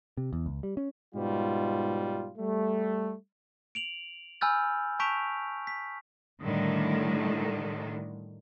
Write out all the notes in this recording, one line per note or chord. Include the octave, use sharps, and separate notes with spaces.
C3
E2
C#2
G3
C#4
G#2 B2 G3 F4
G3 A3
D7 F7 F#7
G#5 B5 E6 F6 G6 A6
A5 C#6 G6 B6 D7 F7
B6
A2 D3 D#3 G3